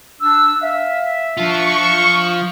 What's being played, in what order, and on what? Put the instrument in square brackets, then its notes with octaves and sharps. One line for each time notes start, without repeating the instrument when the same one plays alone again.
[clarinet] D4 [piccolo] E6
[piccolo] E5 [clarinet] F5
[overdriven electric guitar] F3 F4 [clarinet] D4 [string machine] C#6